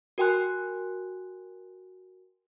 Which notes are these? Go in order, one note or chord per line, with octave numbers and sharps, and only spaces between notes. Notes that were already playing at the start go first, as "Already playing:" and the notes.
F#4 A#4 G5 G#5 C6 F#6